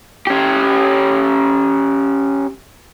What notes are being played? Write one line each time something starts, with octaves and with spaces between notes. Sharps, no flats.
C#4 G4